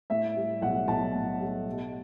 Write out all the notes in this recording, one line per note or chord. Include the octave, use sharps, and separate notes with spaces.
A2 E5
G3
B1 F#5
B1 A5
A2
G3
B2